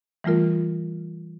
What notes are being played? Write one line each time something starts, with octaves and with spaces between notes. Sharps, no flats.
E3 G3 A3 F4 A#4